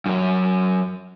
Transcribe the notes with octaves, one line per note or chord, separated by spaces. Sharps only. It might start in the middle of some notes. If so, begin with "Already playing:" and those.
F#2 F#3